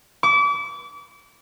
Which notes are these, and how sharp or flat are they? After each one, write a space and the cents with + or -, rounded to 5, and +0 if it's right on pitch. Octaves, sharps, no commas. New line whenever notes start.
D6 -35